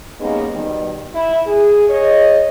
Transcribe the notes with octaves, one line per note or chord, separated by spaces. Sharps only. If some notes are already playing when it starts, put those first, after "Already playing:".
G3 G#3 A#3 B3 C#4 D#4
B2 D#3 G3
E4
G#4
G#4 C#5 D#5